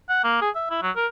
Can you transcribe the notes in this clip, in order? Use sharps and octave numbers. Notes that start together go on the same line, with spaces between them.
F#5
A#3
G#4
E5
E4
F#3
A#4